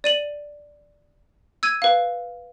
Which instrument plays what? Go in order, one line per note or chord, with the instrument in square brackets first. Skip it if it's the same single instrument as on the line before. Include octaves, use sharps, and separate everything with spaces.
[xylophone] D5 D#7 F#7
E6 G#6 D#7
B4 F5